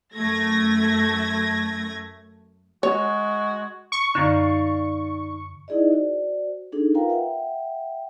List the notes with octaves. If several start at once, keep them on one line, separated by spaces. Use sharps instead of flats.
F#2 A3 G#6 A#6
G#3 F#4 C#5
C#6
F#2 D3 D#4 D5 F5
D#4 E4 G#4 D5 D#5
F#4 C5 D5
D4 D#4 G#4 A4
F4 A#4 B4 F5 G5 A#5
E5 F#5 G5